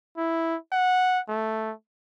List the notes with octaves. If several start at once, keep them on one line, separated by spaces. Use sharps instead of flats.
E4
F#5
A3